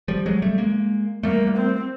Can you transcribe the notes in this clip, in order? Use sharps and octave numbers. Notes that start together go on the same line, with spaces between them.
F3 G3
F#3 G#3
G3 A3
G#3 A#3
G3 A3 A#3
C4